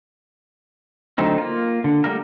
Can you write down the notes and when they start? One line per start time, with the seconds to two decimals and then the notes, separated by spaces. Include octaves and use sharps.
1.18 D3 F#3 A3 C4 D#4
1.38 A#3 F4
1.84 D3
2.04 D3 G3 A3 A#3 A#4